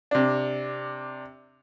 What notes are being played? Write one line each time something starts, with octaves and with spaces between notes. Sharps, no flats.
C3 D4